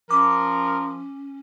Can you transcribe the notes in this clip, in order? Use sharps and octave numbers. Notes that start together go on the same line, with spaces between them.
F3 C#4 A#4 D6